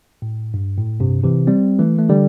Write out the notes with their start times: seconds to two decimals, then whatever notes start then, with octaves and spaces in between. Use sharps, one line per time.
0.22 A2
0.54 G2
0.77 A2
1.00 G2 C3
1.23 C3 E3
1.47 G3 C4
1.79 E3 A3
1.99 A3
2.09 D3 G3